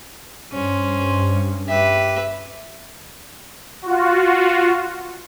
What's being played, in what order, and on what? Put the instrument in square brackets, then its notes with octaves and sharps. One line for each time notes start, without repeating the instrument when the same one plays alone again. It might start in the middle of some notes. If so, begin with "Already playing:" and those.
[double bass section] G2 [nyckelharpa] C#4 [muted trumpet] C5
[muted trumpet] G4 [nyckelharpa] B4 E5
[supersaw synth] F4 F#4